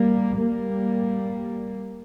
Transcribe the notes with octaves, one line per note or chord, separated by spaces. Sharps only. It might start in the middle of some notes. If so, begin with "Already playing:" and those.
Already playing: G3 A#3
G3 A#3